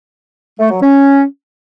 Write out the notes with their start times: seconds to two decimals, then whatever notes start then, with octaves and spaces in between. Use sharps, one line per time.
0.59 A3
0.71 F#3
0.82 C#4